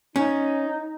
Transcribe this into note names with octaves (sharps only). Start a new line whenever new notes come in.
C#4 D#4